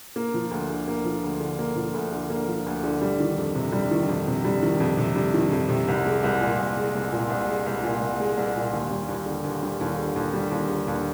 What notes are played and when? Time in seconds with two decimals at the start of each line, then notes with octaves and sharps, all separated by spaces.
0.16 A#3
0.34 F3
0.51 D2
0.70 D3
0.88 A#3
1.05 F3
1.24 D2
1.41 D3
1.59 A#3
1.76 F3
1.94 D2
2.12 D3
2.30 A#3
2.48 F3
2.66 D2
2.84 D3
3.02 G3
3.20 D#3
3.37 F2
3.55 C3
3.72 G3
3.91 D#3
4.09 F2
4.27 C3
4.45 G3
4.63 D#3
4.80 F2
4.97 C3
5.16 G3
5.34 D#3
5.52 F2
5.69 C3
5.88 C2
6.06 G#3
6.24 C2
6.41 A#2
6.58 C2
6.77 G#3
6.95 C2
7.13 A#2
7.30 C2
7.47 G#3
7.66 C2
7.83 A#2
8.01 C2
8.20 G#3
8.37 C2
8.56 A#2
8.73 D#2
8.91 G3
9.09 D#2
9.26 D3
9.44 D#2
9.63 G3
9.81 D#2
9.99 D3
10.16 D#2
10.34 G3
10.51 D#2
10.69 D3
10.88 D#2